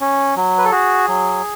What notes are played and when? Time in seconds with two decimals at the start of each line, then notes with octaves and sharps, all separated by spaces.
0.01 C#4
0.36 F#3
0.58 B4
0.65 A4
0.72 F#4 G#4
1.08 F#3